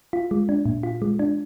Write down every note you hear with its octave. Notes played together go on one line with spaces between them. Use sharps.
F4
G#3
D4
A#2
F4
G#3
D4